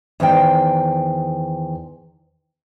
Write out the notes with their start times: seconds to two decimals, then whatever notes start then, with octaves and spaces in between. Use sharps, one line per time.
0.20 E2 D#3 C5 G5